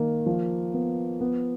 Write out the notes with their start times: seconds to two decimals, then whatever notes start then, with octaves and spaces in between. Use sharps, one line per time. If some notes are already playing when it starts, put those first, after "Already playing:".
Already playing: D#3 A#3
0.26 F3
0.74 B3
1.21 B3